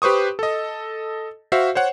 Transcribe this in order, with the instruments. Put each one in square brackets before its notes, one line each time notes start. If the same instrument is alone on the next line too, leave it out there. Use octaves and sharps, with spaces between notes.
[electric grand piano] G4 B4 C5 C#6 D#6
A4 D#5
F#4 C5 E5 F5
C5 C#5 F#5